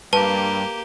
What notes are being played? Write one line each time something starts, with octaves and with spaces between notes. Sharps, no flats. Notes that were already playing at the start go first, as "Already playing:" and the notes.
G2 A#3 G4 B4 A5